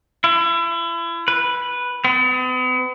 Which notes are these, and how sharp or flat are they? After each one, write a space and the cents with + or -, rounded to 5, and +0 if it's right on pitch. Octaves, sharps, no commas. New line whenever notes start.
E4 +35
B4 -5
B3 +45